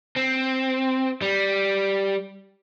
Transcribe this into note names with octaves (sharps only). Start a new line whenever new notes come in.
C4
G3